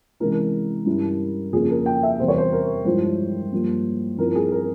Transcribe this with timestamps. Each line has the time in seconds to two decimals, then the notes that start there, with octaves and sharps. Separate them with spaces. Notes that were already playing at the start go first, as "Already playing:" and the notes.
0.20 C3 E3 G#3 C#4 E4 A#4
0.86 G2 G3 C#4 E4
1.53 F2 C#3 F3 A#3 C#4 G#4
1.70 A#4
1.86 G5
2.03 E5
2.20 E2 C3 G3 C5
2.28 C#5
2.38 C5
2.52 A#4
2.85 G2 F3 G#3 E4 C5
3.52 G2 F3 A#3
4.18 G2 F3 C4 E4 A#4
4.35 G#4
4.52 A#4